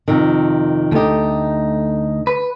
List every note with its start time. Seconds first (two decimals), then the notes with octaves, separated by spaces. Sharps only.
0.08 F2 C3 D#3
0.92 D2 A3 D#4 G4
2.27 B4